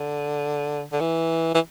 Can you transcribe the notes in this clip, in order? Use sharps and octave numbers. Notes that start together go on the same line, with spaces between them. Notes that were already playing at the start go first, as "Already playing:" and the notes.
Already playing: D3
D3
E3
E3